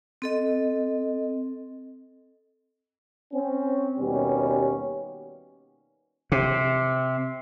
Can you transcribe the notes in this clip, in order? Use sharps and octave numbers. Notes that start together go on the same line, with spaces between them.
C4 A4 D#5
C4 C#4
D#2 B2 G3 C#4
C3